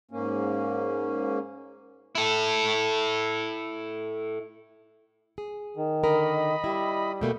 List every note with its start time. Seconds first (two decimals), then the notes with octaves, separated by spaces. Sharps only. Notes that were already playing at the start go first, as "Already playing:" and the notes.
0.11 G#2 A#3 C#4
2.15 E4 A4
5.38 G#4
5.77 D#3
6.04 D3 A#4 D#5 B5
6.64 G3 E4
7.21 B2 A3 A#3 G5